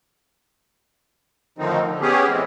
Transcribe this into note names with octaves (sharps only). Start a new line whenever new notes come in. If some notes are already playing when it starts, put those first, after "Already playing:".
A2 D3 D#3 F3 C4 D#4
D3
B3 C#4 G4 G#4
A2 E3 G#3 C4